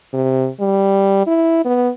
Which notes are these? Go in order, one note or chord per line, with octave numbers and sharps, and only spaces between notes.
C3
G3
E4
B3